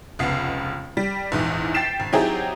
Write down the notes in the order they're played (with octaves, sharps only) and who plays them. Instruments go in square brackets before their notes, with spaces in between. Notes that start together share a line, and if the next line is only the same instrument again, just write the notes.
[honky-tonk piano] F1 C#2 B3 C7
G3
A#1 E2 G#2 E3
G5 A6 B6 C7 E7
G#1
F#3 C4 D#4 E4 G4 G#4